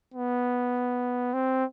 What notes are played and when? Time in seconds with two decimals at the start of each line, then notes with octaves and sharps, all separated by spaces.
0.14 B3
1.34 C4